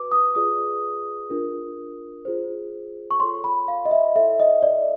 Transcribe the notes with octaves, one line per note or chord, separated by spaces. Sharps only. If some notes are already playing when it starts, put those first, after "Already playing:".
Already playing: F#4 B4 D6
D#6
F4 G#4 B4 D5 D#6
D4 F4 A#4
F4 G#4 C5
C#6
F4 A4 C#5 C6
B5
F5
D#5
E5
E4 A4 C#5 E5
D#5
D5